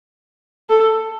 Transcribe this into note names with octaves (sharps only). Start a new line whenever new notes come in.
A4